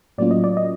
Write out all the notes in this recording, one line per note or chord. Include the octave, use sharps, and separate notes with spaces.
A2 F#3 A#3 C#4 F4 D5
D#5
D5
D#5